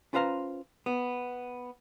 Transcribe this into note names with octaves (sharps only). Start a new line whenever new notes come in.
C#4 F4 B4 C5 F5 A#5
B3